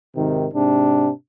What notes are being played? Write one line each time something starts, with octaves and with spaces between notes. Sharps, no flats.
G#1 C3 D#3
G#2 C3 D4